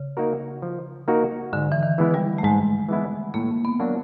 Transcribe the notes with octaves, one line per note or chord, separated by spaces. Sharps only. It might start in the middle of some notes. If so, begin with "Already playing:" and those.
Already playing: C#3
A#3 D#4 F#4 A#4
F3
A#3 D#4 F#4 A#4
G#2 D3
E3
D#3
E3 G#3 B3 E4
G3
A3
G#2 G#3
E3 G#3 B3 E4
A2 A#3
B3
F#3 A#3 D4 F#4